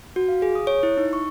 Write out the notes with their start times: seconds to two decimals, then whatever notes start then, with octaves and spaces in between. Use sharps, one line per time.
0.16 F#4
0.29 F5
0.42 G#4
0.55 D#6
0.67 C#5
0.83 E4
0.97 D#4
1.13 C#6